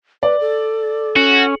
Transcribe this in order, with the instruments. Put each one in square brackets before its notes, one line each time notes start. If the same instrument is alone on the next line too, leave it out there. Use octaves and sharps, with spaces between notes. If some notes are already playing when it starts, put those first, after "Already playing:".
[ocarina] B4 [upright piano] D5
[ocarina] A4
[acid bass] C#4 [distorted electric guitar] F#4